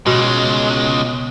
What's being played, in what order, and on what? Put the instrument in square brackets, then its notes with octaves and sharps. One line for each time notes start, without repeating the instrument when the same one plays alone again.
[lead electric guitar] C#2 G#3 [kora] B2